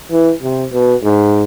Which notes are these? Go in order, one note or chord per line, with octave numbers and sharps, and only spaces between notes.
E3
C3
B2
G#2